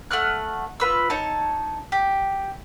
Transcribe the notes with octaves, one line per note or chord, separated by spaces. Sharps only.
A3 F#5 F6 F#6
F4 B4 E6
D#4 C#5 A5
G4